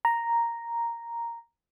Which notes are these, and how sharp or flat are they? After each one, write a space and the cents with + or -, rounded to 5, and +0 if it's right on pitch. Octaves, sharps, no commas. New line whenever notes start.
A#5 +0